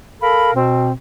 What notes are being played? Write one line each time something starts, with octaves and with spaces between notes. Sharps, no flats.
A4 A#4 F5 B5
B2 C4